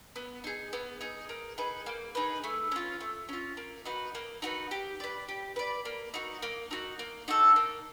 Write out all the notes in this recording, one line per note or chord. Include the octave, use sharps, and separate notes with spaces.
B3
D#4 G#4
B3
D#4 G#4
A#3
D#4 G#4 B4
A#3
D#4 G#4 B4
A3
C#4 F4
A3
C#4 F4
A#3
D#4 F#4 B4
A#3
D#4 F#4 B4
G4
B4 D5
G4
B4 D5
A#3
D#4 F#4
A#3
D#4 F#4
A#3
D#4 F#4 A4
A#3